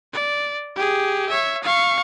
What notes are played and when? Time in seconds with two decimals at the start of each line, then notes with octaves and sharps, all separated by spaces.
0.13 D5
0.76 G4 G#4
1.29 C#5 E5
1.63 F5 C#6